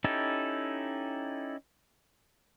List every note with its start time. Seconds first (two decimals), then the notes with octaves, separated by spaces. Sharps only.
0.04 C#4 D#4 E4 G4 A4